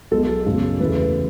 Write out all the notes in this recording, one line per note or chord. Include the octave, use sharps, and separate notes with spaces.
B1 B2 G#3 A4
F#2 C#3 F#3 B3
E1 E2 C#3 E3 A3 B4